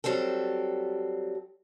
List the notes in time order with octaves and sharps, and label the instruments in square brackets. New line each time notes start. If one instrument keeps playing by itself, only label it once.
[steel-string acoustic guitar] F#3 G3 C4 A4